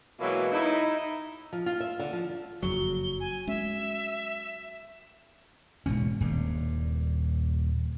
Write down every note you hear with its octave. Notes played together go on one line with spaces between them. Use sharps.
B2 E3 F#3 G#3 A#3 E4
D#4 E4
F3
F4
E5
D3
F3
F#1 F2 C#3 F#3 G7
G#5
G#3 C#4 E5
E1 G#2 B2 C#4
D#1 G2